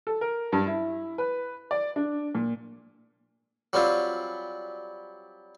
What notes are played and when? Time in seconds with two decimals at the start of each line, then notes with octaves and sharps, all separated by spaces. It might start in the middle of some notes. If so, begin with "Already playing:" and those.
0.07 A4
0.21 A#4
0.52 G2
0.67 E4
1.18 B4
1.71 D5
1.96 D4
2.35 A#2
3.73 F#3 G3 C4 F4